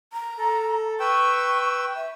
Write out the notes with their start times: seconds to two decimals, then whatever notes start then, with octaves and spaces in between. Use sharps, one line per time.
0.13 A#5
0.38 A4
1.00 B4 G5 C#6 E6
1.96 E5